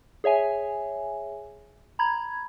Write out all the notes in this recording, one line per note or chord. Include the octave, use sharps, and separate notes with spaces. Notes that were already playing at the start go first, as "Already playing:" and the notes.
G#4 C#5 E5 G#5
A#5 B5 G#6